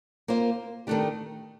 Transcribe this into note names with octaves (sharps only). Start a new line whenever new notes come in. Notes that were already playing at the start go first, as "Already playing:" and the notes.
A#3 F4 C5
D#3 A3 D4 G4